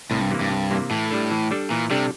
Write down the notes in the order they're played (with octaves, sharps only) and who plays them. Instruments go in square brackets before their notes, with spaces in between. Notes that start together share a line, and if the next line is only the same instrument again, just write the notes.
[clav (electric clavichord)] C2 [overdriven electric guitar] A2
[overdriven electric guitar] G2
[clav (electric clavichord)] C3 E3 A#3
[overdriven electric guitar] G2
[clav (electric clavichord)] C2
C3 E3 A#3
[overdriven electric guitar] A2 [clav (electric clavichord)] E3
[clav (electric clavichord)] G3 D4 A4
E3
G3 D4 A4
[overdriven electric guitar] A#2 [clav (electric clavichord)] E3
[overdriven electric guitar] C3 [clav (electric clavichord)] G3 D4 A4